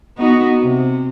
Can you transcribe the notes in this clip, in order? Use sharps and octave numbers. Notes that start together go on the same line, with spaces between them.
B3 D#4 F#4
C3